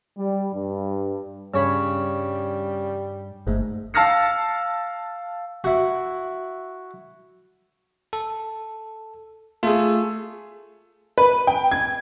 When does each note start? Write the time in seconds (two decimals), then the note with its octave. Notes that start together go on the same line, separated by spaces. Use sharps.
0.18 G3
0.54 G2
1.54 G2 C#3 G3 C#5 B5
3.47 G1 G#2 A3
3.94 F5 A5 E6 F6 A#6 C#7
5.64 E4 F#4
8.13 A4
9.63 A3 F4 G#4
11.18 B4
11.47 G5
11.71 G#6